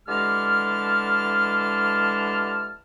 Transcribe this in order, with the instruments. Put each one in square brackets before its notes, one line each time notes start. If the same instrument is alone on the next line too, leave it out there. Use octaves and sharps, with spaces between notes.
[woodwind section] D3 E3 G#3 G4 A5 F6